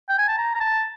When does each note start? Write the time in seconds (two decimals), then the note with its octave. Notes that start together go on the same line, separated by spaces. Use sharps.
0.09 G5
0.18 G#5
0.28 A5
0.37 A#5
0.55 A#5
0.60 A5